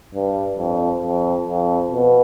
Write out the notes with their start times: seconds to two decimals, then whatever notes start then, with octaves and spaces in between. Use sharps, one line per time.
0.14 G2
0.58 F2
1.03 F2
1.47 F2
1.91 B2